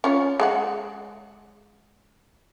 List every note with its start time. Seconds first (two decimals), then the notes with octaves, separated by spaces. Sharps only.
0.04 C#4 F4 C#5
0.40 G#3 A4 F#5